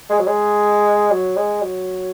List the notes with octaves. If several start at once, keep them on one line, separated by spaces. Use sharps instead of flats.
G#3
F#3
G#3
F#3
G#3
F#3